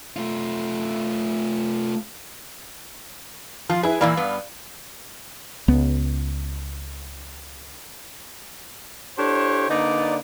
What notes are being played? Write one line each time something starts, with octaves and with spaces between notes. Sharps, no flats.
A3 F4
F3 F4
E4 G#4 B4
A#2 E3 A#3 D5 F5 B5
G2 B3
C#2 B3
D4 E4 G4 A4 C5 C#5
D3 A#3 D#4 B4 D5